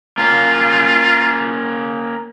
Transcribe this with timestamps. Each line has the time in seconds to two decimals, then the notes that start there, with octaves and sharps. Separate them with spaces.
0.18 A#3 C#4 F4 F5